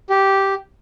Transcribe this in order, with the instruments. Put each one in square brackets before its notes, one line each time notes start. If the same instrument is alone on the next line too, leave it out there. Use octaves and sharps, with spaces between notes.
[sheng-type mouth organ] G4